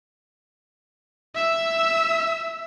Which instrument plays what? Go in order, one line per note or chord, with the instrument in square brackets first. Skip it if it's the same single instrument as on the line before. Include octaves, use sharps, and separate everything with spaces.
[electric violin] E5 E6